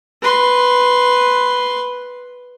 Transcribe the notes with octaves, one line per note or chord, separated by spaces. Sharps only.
B4 C6